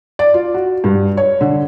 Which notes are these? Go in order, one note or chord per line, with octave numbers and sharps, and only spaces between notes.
D5
F4
F#4
G2
C#5
D3